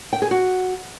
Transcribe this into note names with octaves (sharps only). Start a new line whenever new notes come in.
G5
G#4
F#4